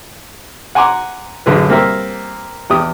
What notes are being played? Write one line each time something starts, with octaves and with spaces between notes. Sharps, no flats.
F#5 G#5 A#5 C6 D6
A1 F#2 D3 G#4 B4
G3 A#3 C4 A#4 E5
E2 G4 D#6